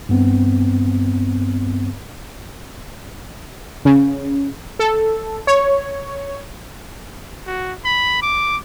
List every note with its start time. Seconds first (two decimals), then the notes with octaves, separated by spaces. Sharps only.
0.09 G2 B3 C4
3.85 C#3
4.79 A4
5.47 C#5
7.46 F#4
7.85 B5
8.22 D6